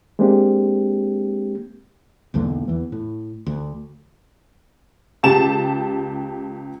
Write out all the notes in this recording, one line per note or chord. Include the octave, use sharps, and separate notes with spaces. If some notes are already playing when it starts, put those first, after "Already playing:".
G#3 A#3 C4 D4 G4
B1 E2 D3 A#3
E2 E3
A2
D2
C#2 G4 A5 E7